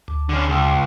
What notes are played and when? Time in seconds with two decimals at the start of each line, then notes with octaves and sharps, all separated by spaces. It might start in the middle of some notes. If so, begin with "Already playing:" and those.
0.08 D2
0.29 D3 C#4
0.49 C#2